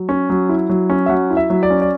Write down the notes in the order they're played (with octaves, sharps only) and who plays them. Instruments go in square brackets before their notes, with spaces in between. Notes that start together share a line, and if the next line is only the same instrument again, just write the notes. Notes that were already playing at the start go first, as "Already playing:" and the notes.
Already playing: [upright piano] F#3
C#4
F#3
E4
F#3
C#4
E5
F#3 F#5
E4
E5
F#3
D5
C#4
D5